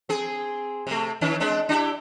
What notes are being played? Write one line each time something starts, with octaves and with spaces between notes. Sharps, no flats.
C4 G#4
C3 A3
D#3 C#4 E4
G#3 C4 D4
D4 E4 G4